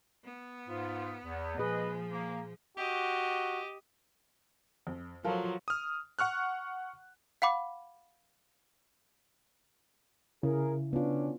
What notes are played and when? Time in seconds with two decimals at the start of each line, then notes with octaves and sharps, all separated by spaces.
0.24 B3
0.68 G#2 F4
1.25 E2
1.58 A#2 F3 G#4 B4 D#5
2.11 A#3
2.77 F#4 G4 D#5
4.87 F2
5.24 F3 F#3 F4 A4 A#4
5.68 D#6 F6
6.19 F#5 C#6 F6 F#6
7.42 F5 F#5 B5 D6
10.43 C#3 E4 G#4 A#4
10.93 B3 C#4 D4 F4